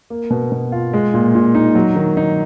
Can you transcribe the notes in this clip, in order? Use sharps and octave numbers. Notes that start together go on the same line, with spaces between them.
A#3
B2
B2
F4
G#3
A#2
A#2
D#4
F#3
D#3
D#4